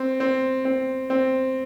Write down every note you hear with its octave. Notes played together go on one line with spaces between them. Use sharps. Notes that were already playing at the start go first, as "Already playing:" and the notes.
Already playing: C4
C4
C4
C4